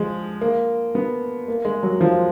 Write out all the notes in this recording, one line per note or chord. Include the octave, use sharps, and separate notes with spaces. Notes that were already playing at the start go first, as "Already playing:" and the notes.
Already playing: F3 G#3
A#3
B3
A#3
G#3
F#3
F3